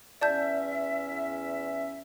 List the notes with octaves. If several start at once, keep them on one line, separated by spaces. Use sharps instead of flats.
E2 C#4 D5 E5 A5 G6